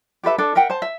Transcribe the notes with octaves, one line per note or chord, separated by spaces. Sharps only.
G4 A4 B4 E5
D4 A4
A#4 E5 F#5 G5
C5 A5
E5